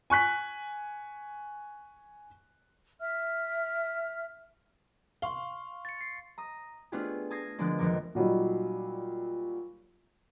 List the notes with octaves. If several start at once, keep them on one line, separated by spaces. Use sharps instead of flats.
G#5 C#6 F#6 B6
E5 F6
F5 C6 C#6 G7
A6 C#7
C7
A#5 D#6
A3 B3 D4 F4 G4 G#4
A5 D#6 G#6 A#6 C7
D3 F3 G#3 A#3 B3 D4
F1 F2 D#3 D#4 A#4 D6
A#2 F#3 G3 D#4